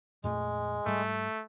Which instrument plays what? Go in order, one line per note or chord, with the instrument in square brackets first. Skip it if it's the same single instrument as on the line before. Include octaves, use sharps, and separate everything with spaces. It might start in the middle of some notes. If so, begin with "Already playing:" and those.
[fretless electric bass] F2 A#2 A3 [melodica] G#3
[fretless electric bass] G#2 G3 [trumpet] A3